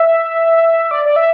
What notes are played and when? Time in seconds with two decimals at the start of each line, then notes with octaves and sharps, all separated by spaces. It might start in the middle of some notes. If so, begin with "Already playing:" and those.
Already playing: E5
0.91 D5
1.05 D5
1.16 E5